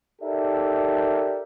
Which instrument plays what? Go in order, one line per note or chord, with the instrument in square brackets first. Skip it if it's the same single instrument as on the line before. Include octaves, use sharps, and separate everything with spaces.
[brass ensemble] D#4 G4 A4 A#4 D5 E5